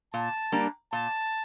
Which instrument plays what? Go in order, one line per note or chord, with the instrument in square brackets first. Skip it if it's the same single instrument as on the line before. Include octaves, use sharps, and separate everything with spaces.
[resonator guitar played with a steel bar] A#2 [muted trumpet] A5
[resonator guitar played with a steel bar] G3 A#3 D4
[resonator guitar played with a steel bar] A#2 [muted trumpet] A5